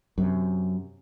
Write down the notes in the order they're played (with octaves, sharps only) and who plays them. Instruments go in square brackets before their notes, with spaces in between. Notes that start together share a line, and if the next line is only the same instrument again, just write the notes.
[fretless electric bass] F#2 C3